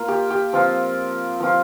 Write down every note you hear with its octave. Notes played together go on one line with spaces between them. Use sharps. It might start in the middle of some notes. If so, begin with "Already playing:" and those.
Already playing: A#3 F4
G4
G4
F3 C4 F4
F3 C4 F4